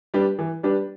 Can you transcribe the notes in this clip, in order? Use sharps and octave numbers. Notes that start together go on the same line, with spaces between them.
G3 D4 G4 B4
E3
G3 D4 G4 B4